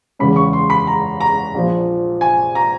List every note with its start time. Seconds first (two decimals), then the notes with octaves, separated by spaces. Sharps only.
0.19 E2 C#3 E3 G#3 C#4 B5
0.36 C#6
0.53 C6
0.70 B5
0.87 A#5
1.20 A#5
1.54 A#1 A#2 F3
2.21 G#5
2.55 A#5